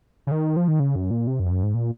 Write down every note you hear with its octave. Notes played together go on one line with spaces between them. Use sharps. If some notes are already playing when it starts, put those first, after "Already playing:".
C#3
D#3
F3
D#3
C#3
F#2
A#2
C3
F#2
F2
F#2
G#2
A#2